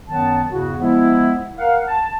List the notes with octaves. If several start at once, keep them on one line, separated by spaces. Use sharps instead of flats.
F#2 D#3 F#3 B3 F#5 A5
E2 G2 C#3 E4 F#4
F3 G#3 B3 E4
A#4 F5 F#5
A5